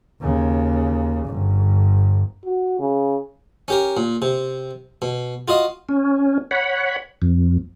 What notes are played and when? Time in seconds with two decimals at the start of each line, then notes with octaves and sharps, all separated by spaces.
0.22 D#2 C#3
1.26 G1
2.45 F#4
2.80 C#3
3.68 C#4 G4 A#4
3.97 A#2
4.22 C3
5.02 B2
5.48 F4 F#4 D#5 F5
5.89 C#4
6.51 C#5 F#5 B5
7.22 F2